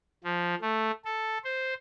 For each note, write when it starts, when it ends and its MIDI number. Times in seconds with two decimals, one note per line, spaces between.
0.24 0.55 53
0.61 0.91 57
1.05 1.38 69
1.44 1.74 72